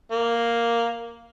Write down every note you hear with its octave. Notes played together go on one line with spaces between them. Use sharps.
A#3